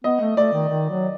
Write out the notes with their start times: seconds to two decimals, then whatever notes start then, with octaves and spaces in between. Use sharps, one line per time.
0.04 B3 D#5
0.20 A3
0.37 A3 D5
0.53 D#3
0.69 D#3
0.90 F#3